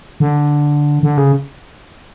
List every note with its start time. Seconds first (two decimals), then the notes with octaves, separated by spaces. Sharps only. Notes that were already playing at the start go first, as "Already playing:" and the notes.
0.20 D3
1.03 D3
1.18 C#3